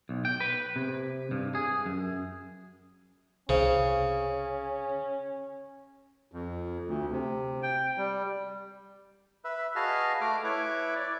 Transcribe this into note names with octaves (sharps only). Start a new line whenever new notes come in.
B1
G5
B4
C3
G2
G#4
F#2
C2 C#3 C#4 C5
F2
D2
C3
G5
G3
B4 E5
F#4 G#4 B4 D#5 F5 A5
A3 D6 F6
E4 B4 C#5 D6
D5